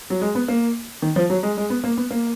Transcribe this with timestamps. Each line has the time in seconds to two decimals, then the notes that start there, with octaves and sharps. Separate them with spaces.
0.10 F#3
0.22 G#3
0.35 B3
0.48 A#3
1.02 D#3
1.16 F3
1.30 F#3
1.43 G#3
1.57 G#3
1.70 B3
1.84 A#3
1.97 B3
2.10 A#3